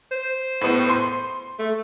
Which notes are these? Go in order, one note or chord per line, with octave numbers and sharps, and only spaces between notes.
C5
A2 B3
C6
A3